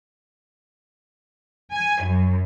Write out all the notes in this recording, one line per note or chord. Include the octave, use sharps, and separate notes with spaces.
G#5
F#2